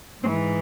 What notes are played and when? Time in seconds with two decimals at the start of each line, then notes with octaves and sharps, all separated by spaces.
0.22 G#2 C4
0.28 E3